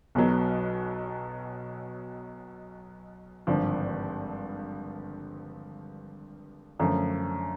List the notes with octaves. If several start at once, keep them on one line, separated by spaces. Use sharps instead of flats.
B1 B2 F#3 B3
G#1 G2 D3 F3
F#2 D3 F3 A3 C#4